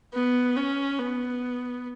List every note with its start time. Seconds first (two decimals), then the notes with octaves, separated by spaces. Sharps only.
0.14 B3
0.56 C#4
0.99 B3